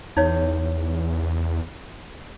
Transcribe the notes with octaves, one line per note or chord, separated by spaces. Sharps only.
E2 D#4 C#5